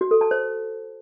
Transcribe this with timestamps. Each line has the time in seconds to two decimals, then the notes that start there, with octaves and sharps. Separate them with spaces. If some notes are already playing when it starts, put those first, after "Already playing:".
0.01 F#4
0.11 A4
0.21 A5
0.31 C5